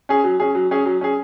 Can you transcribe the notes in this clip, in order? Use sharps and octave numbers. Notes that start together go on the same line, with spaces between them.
C#4 G#4
F#3
C#4 G#4
F#3
C#4 G#4
F#3
C#4 G#4